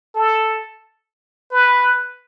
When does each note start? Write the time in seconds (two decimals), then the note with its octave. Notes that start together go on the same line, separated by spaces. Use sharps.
0.15 A4
1.51 B4